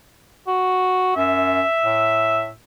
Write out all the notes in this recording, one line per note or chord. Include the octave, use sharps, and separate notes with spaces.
F#4
F#2 E5
A2